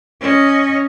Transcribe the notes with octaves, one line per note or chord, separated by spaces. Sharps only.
C#4 D#5